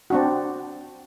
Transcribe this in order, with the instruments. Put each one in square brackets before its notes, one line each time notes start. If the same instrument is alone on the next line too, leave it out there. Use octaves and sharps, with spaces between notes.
[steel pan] C4 D4 F#4